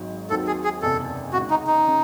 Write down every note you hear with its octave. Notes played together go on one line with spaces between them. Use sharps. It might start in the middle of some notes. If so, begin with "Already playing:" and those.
Already playing: G#1 G#2 F#3
D#2 D#3 F#3 C4 F#4 A4
G#4
G#4
F#1 E2 C3 A4
C#2 C3 D#3 F#4
D#4
D#4
C#3